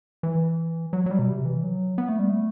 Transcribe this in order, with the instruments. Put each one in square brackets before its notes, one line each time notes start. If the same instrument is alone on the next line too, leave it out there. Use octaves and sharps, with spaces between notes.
[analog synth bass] E3
F#3
F#3
G3
B2
C3
E3
F#3
B3
A3
G3
A3